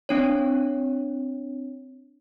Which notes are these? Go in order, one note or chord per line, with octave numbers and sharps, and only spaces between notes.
C4 D4 C#5